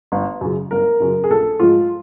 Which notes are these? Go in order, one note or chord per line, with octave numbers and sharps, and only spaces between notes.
G1
F#2 C#3
G1 A#4
F#2 C#3
G#4
A#1 A4
G#2 F3 G#3 F4